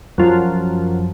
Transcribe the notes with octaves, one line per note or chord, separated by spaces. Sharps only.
F#2 F3